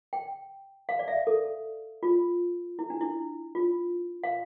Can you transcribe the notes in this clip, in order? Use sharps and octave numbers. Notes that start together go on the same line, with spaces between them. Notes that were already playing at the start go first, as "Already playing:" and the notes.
G5
F5
D5
E5
A4
F4
E4
D4
E4
F4
F5